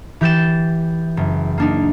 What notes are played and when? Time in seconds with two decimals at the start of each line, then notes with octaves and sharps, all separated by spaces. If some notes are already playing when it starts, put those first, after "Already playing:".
0.21 E3 G4 G6 A6 E7
1.17 F#1
1.58 A#3 D4 D#4